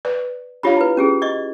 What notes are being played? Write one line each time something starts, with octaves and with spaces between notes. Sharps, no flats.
B4 D5
D4 F4 G4 C#5 F5 B5
E4 B4
C#4 G4 G#4
D5 D#5 C#6